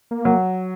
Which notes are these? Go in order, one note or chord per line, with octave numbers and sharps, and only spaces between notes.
A#3
F#3